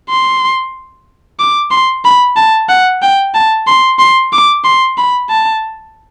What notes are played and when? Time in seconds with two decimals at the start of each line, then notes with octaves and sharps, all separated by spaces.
0.09 C6
1.39 D6
1.71 C6
2.05 B5
2.36 A5
2.69 F#5
3.02 G5
3.34 A5
3.67 C6
3.99 C6
4.33 D6
4.64 C6
4.98 B5
5.30 A5